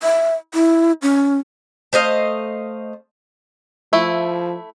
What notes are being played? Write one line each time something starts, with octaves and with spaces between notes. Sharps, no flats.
E5
E4
C#4
A3 C5 D#5 F5
F3 A3 E4